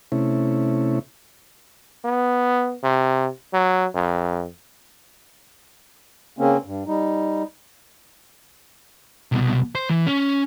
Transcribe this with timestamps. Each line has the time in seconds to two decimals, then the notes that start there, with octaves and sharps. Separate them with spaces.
0.12 C3 A3 C#4 E4
2.05 B3
2.83 C3
3.53 F#3
3.95 F2
6.39 C#3 A#3 C4 C#4
6.65 G2
6.87 G3 D#4
9.32 C2 B2
9.75 C5
9.90 E3
10.06 C#4